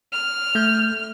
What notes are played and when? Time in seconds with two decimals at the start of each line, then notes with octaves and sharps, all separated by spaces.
0.13 F6
0.55 A3 G6